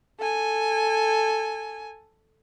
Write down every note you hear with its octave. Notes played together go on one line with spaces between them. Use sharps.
A4 G#5